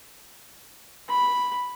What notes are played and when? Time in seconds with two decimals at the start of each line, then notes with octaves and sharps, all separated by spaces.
1.09 B5